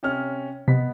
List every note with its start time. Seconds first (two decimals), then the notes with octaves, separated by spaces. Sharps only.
0.03 C3 C#4 F6
0.68 C3 B3 D#5 B6